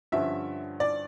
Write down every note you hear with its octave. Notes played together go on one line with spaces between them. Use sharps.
G2 D3 F3 C#4 E5
D5